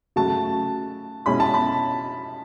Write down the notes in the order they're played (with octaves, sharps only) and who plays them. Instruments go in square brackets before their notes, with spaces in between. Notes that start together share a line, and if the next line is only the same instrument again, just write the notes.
[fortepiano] C#3 F#3 A3 [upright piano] A5
[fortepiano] B2 G#3 C#4 E4 [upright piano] B5
[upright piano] A5
B5